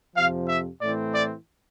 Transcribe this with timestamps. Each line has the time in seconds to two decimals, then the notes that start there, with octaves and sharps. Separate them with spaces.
0.16 F2 C3 F3 F5
0.49 E5
0.82 A2 E3 A3 C4 D5
1.15 D5